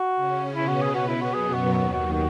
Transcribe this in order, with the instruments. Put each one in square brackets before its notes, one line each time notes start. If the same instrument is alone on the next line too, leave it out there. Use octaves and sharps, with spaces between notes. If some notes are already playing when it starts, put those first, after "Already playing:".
Already playing: [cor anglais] F#4
[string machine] C#3 C#4
[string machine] B2 B3 [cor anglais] E4
[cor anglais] F#4
G#4
F#4
E4
F#4
[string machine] F#2 F#3 [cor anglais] G#4
[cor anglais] F#4
[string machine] D#2 D#3 [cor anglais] F#4
[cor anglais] F#4
F#4